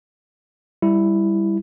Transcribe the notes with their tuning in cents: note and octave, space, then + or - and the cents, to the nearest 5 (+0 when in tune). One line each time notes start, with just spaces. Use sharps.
G3 +10 E4 +0